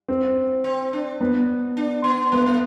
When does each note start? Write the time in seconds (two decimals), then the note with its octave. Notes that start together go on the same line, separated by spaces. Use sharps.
0.08 C4
0.64 C4
0.93 D4
1.21 B3
1.77 D4
2.04 B3
2.32 A3 B3
2.46 A3